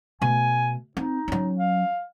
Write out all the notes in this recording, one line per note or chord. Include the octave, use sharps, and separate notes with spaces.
B2 A3 G#5
C4 D#4
F#3 C#4
F5